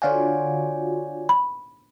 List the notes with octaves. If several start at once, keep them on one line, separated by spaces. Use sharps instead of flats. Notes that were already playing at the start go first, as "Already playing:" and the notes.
D3 F4 F#4 C#5 D5 G#5
B5